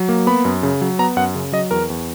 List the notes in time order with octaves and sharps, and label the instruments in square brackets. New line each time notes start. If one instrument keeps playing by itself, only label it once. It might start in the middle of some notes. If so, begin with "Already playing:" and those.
Already playing: [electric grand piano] F#3
A#3
B3 B5
F#2
C#3
F#3
B3 A#5
F#2 F#5
C#3
F#3 D#5
E2 A#4
E2